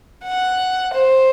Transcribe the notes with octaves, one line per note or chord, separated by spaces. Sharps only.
F#5
C5